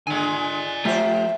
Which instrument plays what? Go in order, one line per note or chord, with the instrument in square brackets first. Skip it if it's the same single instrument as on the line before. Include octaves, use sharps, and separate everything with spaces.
[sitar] D3 G#3 [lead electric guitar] D5 G#5
[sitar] F3 C5 [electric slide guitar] A3 F4 G4 [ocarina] E5